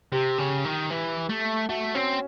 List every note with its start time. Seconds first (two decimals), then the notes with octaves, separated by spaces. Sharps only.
0.12 C3 G4
0.38 C#3
0.65 D#3
0.90 E3
1.30 A3
1.69 A3 F#4
1.95 C4 C#4